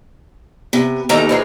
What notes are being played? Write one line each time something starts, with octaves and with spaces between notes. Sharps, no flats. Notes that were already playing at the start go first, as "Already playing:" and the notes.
C3 B3
D#2 D#3 E3 D#4 A4 A#5
E3 F3 G#3